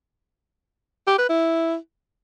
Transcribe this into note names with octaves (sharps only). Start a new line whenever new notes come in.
G4
B4
E4